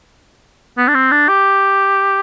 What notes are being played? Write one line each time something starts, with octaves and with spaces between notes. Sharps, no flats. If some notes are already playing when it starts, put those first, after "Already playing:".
B3
D4
C4
D4
G4